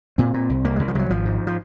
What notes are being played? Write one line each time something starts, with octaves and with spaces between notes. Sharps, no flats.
A#2 C4
A#2
C2
C2 A#3
C2 G#3
F3
C2 F#3 G#3
G#1 F3
G#2
F3